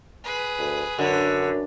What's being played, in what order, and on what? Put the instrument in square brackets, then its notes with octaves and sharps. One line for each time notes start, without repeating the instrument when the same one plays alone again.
[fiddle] G#4 B4
[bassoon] D2
[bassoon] F#2 [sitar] D3 [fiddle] B4 C#5